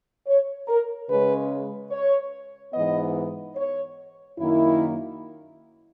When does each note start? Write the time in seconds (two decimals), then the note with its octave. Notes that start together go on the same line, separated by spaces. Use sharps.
0.26 C#5
0.68 A#4
1.09 C#3 G#3 C#4 B4
1.91 C#5
2.73 G#2 E3 B3 D#5
3.56 C#5
4.38 F#2 D#3 A#3 E4